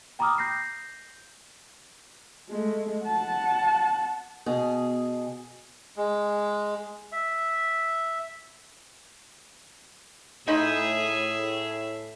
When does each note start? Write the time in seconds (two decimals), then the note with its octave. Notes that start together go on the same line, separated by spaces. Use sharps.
0.19 G5 A#5 B5 D6 D#6 F6
0.38 G6 A#6 C7
2.50 G#3 A3
3.04 F#5 A5
4.46 B2 G#4
5.96 G#3
7.12 E5
10.48 A2 D#4 G#4 C5 E5 B5